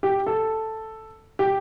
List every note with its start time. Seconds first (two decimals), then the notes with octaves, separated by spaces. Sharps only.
0.03 G4
0.27 A4
1.39 G4